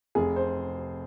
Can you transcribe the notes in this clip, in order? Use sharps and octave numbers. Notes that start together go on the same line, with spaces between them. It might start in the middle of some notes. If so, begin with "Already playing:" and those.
F1 G#4
C5